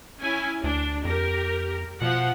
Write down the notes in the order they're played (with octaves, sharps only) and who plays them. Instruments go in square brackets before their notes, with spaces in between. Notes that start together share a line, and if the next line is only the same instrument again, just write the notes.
[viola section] C#4 E4 G#5
[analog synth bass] D2 [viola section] D4
[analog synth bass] F2 [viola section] G4 A#4
[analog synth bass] B2 [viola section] F3 F#5